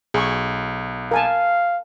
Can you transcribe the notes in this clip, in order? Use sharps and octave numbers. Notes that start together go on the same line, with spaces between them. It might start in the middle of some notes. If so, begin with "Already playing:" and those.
B1 G#4 C#6
A#4 F5 G#5 A5